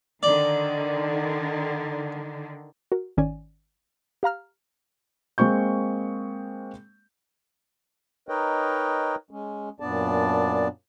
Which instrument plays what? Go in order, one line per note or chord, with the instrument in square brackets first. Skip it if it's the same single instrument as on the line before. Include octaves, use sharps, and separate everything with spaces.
[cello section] D3 D#3 [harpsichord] D5
[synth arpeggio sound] F#4 A#4
G#1 D#3 C#4 D5 G#5
G4 F5 A#5 F6
[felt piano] G#3 A#3 C4 C#6 G6
[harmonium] D#4 A#4 B4 C#5 D#5 G5
G#3 C#4
F#2 A#2 B3 D4 D5 A5